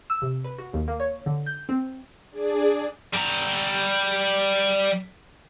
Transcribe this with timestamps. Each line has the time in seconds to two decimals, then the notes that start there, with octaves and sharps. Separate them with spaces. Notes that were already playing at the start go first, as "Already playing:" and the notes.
0.10 E6
0.22 C3
0.44 B4
0.58 F#4
0.73 D#2
0.88 A#3
1.00 C#5
1.26 D3
1.46 G6
1.69 C4
2.31 D4 G#4 D5
3.14 G3 A#5